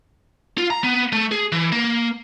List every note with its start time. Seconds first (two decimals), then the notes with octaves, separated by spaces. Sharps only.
0.58 F4
0.70 A#5
0.84 B3
1.12 A3
1.31 G#4
1.52 E3
1.72 A#3